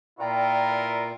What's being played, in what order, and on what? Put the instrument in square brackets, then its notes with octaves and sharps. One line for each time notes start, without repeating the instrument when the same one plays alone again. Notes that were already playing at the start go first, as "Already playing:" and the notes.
[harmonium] A#2 D5 A#5 [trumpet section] E4 F4 A#4 [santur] G5
[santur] B4